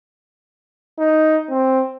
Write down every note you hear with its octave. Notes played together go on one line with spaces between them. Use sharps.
D#4
C4